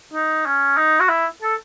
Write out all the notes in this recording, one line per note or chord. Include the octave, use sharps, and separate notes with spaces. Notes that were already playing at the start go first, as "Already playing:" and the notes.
D#4
C#4
D#4
F#4
E4
A4